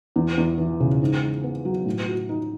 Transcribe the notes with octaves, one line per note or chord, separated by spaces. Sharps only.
E2
E2
E3
C#3
G#2
D#4
B3
F#3
A2
F#4
D#4